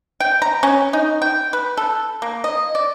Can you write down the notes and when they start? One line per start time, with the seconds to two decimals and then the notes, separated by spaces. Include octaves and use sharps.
0.20 G5
0.42 A#5
0.63 C#4
0.93 D#4
1.22 G5
1.53 B4
1.77 A4
2.22 A#3
2.44 D#5
2.75 D5